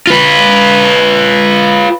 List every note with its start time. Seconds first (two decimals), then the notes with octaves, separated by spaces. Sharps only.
0.07 F4 B4